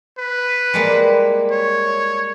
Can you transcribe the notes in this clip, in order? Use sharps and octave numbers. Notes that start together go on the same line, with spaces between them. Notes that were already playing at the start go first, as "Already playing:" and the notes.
B4
G3 G#3 A#3
C#5